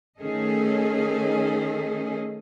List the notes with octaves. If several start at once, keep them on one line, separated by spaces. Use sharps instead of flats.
D#3 A3 C#4 G#4 A4 D#5